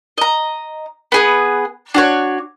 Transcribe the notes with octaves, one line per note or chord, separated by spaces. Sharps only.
D#5 A#5
B3 G#4 B4
D4 F#4 C#5